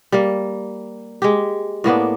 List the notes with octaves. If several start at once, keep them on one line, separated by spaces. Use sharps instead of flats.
G3 A#3
G#3 G4
A2 A#3 B3 D4